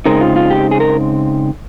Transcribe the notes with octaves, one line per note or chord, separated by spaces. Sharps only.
C#3 G#3 C4 D#4 A#4
F4
F4
G4
G#4
A#4